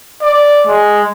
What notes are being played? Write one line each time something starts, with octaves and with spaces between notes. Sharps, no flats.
D5
G#3